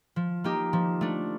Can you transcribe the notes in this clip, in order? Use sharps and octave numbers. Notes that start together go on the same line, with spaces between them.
F3
A#3 D#4 G4
F3
A3 D4